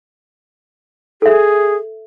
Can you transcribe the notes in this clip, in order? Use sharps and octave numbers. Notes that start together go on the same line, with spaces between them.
G#4 A4 E5